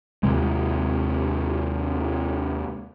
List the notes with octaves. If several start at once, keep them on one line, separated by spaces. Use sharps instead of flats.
D#2 C3 G#3